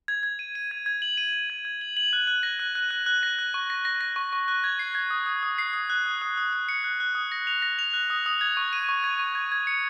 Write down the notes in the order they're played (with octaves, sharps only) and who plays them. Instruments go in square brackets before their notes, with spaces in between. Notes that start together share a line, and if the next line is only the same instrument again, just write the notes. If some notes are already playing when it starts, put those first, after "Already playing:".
[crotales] G#6
G#6
D#7
D#7
G#6
G#6
F#7
D#7
D#7
G#6
G#6
F#7
F#7
F#6
F#6
A#6
F#6
F#6
F#6
F#6
A#6
F#6
C#6
A#6
A#6
A#6
C#6
C#6
F#6
G#6
C7
G#6
D#6
D#6
D#6
C7
D#6
F#6
D#6
D#6
D#6
D#6
C#7
F#6
F#6
D#6
A#6
F7
A#6
F7
F#6
D#6
D#6
G#6
C#6
D#7
C#6
G#6
C#6
G#6
G#6
C#7